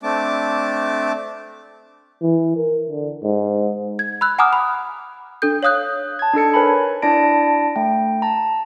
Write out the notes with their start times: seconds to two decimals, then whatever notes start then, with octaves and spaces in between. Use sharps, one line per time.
0.03 A3 C4 D4 A5 D6
2.22 E3
2.56 A#4
2.89 D3
3.23 G#2
3.99 G#6
4.21 B5 E6 F#6
4.39 F#5 G#5 A#5 D6 D#6 F6
4.53 B5
5.42 D4 A4 G6
5.63 C#5 F5 D#6 F#6 G6
6.19 A5 G#6
6.33 D4 D#4 A4 C#7
6.54 A#4 B4 C#5 G#5 A#5 B5
7.02 D4 E4 D5 A5 A#6 D7
7.76 A3 G5
8.22 A5 A#5